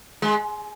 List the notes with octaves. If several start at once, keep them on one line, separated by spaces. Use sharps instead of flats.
G#3